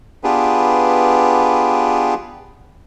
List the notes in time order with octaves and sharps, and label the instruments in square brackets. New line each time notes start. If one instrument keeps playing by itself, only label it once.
[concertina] B3 D4 F4 G4 G#4 B4